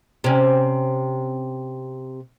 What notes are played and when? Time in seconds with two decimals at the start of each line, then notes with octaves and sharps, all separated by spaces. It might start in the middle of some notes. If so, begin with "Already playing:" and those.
0.24 C3 C#4